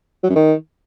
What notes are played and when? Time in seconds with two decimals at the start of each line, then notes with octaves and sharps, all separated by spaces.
0.24 F#3
0.30 F#2
0.36 D#3